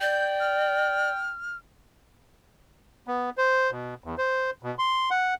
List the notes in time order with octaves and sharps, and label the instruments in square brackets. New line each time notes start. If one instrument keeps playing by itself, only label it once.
[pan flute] D5 [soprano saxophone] G5 [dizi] G6
[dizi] F6
[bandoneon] B3
C5
B2
E2
C5
B2
C6
F#5